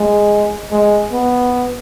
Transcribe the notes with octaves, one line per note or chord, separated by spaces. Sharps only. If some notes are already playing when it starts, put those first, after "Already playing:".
Already playing: G#3
G#3
B3